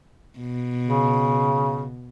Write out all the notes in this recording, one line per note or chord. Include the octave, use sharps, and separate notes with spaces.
B2
C#3